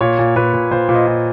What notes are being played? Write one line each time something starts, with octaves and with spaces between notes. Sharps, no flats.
A#2 C#5
A#2
A#2 B4
A#2
A#2 C5
A#2
D#5
A#2